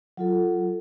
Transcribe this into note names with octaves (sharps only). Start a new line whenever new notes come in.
F#3 F4 A4